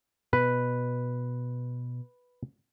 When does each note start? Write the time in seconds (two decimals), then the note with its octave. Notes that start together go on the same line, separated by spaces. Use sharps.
0.33 B2 B4